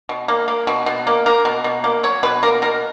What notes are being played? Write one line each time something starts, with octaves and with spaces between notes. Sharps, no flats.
B2
A#3
A#3
B2
B2
A#3
A#3 A#4
B2
B2
A#3
F#3 C#5
B2 B4
A#3 A#4
B2 A#4